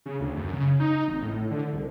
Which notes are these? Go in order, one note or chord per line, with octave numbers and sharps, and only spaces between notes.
C#3
D2
F#2
C#3
D#4
G#1
A2
D3
C2